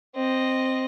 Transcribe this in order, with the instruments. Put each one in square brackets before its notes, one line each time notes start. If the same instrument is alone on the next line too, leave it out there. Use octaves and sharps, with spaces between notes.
[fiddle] C4 D#5